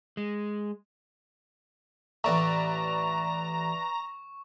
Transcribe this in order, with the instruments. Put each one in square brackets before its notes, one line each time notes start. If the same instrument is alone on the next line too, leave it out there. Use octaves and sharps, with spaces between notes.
[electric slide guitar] G#3
[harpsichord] A1 A3 [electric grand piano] B4 D5 E5 [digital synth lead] A#5 [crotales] C#6